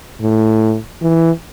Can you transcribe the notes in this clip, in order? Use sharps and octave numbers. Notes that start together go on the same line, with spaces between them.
A2
E3